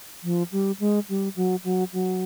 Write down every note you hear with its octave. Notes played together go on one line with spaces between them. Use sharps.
F3
G3
G#3
G3
F#3
F#3
F#3